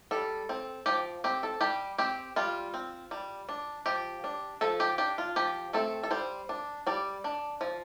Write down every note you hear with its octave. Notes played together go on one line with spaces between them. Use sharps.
G3 A4
C4
F3 G4
C4 G4
A4
G3 G4
C4 G4
G3 F4
C4
G3
D4
F3 G4
D4
F3 A4
G4
D4 G4
F4
F3 G4
A3 C4 A4
A4
G3 C5
D4
G3 D5
D4
F3